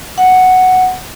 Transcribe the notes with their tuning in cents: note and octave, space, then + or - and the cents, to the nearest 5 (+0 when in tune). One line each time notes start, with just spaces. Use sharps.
F#5 +0